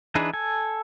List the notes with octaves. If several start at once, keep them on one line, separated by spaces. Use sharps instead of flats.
E3 D4 D#4 G#4 B4
A4 G#5